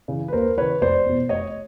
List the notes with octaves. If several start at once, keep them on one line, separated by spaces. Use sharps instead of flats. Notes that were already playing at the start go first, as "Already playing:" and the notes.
C#3 E3
B4
D#2 A#4 C5
C#3 E3 B4 C#5
F1 C5 D5
E2 B2
F1 C#5 D#5